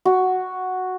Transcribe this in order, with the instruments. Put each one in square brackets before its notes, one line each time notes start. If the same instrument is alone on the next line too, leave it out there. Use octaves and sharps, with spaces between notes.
[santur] F#4